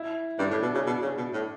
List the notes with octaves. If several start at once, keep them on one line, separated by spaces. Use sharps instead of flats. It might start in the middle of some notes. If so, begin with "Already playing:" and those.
Already playing: E4
G2 D4
A2
B2
C#3
B2
C#3
B2
A2